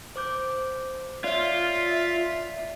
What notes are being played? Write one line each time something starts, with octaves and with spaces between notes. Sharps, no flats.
C5 D6 G6
F4 C#5 D5 E5